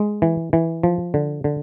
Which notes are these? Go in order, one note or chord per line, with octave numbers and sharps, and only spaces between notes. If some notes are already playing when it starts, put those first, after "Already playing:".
Already playing: G#3
E3
E3
F3
D3
D3